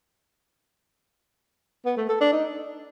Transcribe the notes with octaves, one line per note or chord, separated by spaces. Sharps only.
B3
A3
A4
D4
D#4